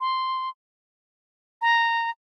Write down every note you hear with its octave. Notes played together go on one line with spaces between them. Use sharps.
C6
A#5